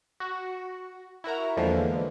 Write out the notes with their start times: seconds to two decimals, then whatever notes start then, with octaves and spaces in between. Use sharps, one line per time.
0.20 F#4
1.24 E4 F#4 A#4 A#5
1.57 E2 D3 E3 F3 G#3 A#3